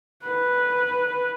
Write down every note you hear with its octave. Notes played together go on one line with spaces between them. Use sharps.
B4